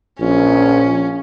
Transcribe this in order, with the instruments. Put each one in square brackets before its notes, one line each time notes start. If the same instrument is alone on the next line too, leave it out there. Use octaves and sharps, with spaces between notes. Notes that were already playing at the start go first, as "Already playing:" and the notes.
[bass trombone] A#1 [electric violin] C#4